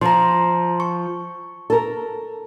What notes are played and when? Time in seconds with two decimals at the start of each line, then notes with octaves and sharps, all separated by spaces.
0.01 F3 A#5 C6
0.80 C#6
1.70 A4 A#4